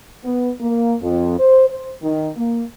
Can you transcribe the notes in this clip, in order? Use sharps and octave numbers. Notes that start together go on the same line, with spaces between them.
B3
A#3
F2
C5
C5
D#3
A#3